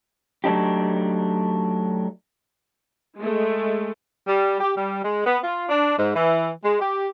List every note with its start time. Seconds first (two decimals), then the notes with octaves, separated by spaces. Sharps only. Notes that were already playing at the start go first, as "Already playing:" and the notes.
0.44 F#3 A3 D4 D#4 G4
3.18 G#3 A3
4.27 G3
4.60 G4
4.77 G3
5.05 G#3
5.26 B3
5.44 F4
5.69 D4
5.99 G#2
6.15 E3
6.64 G#3
6.81 G4